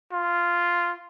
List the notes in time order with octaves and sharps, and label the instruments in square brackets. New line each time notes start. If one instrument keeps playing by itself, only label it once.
[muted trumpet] F4